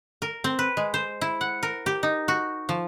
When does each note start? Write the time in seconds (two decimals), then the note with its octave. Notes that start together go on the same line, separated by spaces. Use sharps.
0.22 A#4
0.44 C4
0.59 B4
0.77 G#3
0.94 C5
1.21 E4
1.41 F#5
1.63 A#4
1.86 G4
2.03 D#4
2.28 F#4
2.69 F3